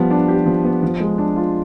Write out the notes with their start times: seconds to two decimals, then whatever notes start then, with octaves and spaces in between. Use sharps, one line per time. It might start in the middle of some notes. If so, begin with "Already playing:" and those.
Already playing: F3 G3 B3
0.10 D4
0.28 G4
0.46 F3
0.65 B3
0.83 F3
1.00 G#3
1.18 D4
1.36 F4